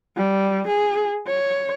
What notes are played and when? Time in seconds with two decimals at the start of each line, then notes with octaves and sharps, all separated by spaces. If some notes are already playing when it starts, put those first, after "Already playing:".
0.17 G3
0.67 G#4
1.27 C#5